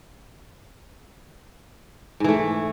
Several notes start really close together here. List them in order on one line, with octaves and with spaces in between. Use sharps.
G#2 E3 A3